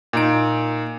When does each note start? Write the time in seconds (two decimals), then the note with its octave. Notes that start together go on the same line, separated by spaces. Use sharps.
0.13 A#2 D#4 D7